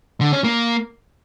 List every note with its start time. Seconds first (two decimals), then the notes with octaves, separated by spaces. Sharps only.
0.21 D3
0.33 C#4
0.44 A#3